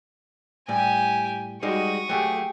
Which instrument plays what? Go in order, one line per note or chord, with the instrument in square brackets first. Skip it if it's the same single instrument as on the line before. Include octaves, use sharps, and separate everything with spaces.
[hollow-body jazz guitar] A2 G3 [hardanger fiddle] G4 G#5
[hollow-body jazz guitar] G3 G#3 D#4 [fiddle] F#4 [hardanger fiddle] C#6 D#6
[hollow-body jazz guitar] F#3 A3 [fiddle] G4 G#4